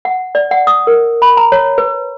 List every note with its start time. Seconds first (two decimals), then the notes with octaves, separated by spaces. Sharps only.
0.05 F#5
0.35 D5
0.51 F#5
0.67 D#6
0.87 A#4
1.22 B5
1.37 A#5
1.52 C#5
1.78 B4